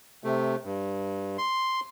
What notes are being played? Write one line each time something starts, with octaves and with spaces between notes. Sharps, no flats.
C3 A3
G2
C6